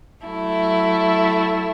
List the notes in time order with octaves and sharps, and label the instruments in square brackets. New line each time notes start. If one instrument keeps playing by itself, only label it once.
[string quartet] F#3 A3 E4